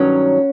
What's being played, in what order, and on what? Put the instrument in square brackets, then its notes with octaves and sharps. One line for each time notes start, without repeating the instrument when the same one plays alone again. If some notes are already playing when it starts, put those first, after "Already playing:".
Already playing: [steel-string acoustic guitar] G2 D#3 F#3 C#4